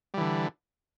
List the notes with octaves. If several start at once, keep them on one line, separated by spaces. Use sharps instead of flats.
D3 E3 G3